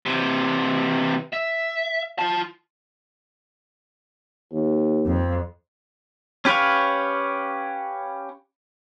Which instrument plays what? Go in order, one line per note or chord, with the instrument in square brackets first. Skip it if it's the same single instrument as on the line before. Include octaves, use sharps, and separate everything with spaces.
[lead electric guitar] C3 E3
E5
F4 A5
[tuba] D#2
[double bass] F2
[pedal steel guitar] C#4 G4 B4 C#5 F5